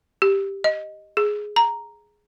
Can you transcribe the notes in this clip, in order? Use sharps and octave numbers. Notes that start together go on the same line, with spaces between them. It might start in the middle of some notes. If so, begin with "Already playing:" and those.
G4
D#5
G#4
A#5